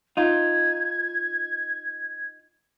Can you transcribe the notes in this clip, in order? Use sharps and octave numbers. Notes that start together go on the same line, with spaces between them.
D#4 F4 G#6